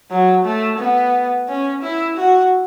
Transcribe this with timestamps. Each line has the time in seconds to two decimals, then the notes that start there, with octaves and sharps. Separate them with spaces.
0.11 F#3
0.45 A3
0.79 B3
1.49 C#4
1.82 E4
2.17 F#4